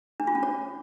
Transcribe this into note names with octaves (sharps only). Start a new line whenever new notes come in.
D4
F4
C#4
C#5